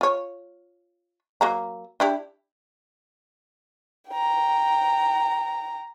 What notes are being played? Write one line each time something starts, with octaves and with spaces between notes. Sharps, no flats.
F4 C#5
F#3 A#3 A#5
D4 E4 G4
G5 A#5